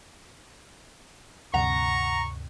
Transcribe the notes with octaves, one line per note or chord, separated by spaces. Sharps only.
D2 G2 C3 F#5 A#5 C#6